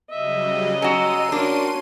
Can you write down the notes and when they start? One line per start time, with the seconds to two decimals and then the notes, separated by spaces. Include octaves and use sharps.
0.12 C#3 F#3 G3 D#5 E5
0.82 C#4 F#4 A#5 C6 E6 D#7
1.32 A#3 C#4 D4 F#4